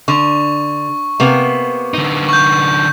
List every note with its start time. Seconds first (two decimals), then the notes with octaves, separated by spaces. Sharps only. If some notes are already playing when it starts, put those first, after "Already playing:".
0.08 D3 C#6
1.20 C3 A#3 B3
1.94 D3 D#4
2.29 C#6 G6